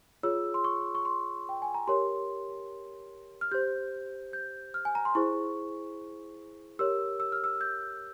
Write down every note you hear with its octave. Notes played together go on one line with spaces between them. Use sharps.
F4 G#4 C#5 E6
C6
C#6
C#6
C6
G5
G#5
A#5
G4 A#4 C#5 C6
F6
G4 C5 G6
G6
F6
G#5
A#5
C6
E4 G#4 C5 C#6
G4 A#4 C#5 E6
E6
F6
E6
G6